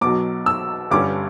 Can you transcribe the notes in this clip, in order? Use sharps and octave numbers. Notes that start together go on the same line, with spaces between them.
B1 B2 F#3 D6
E6
G1 G2 D3 G3 C#4 D6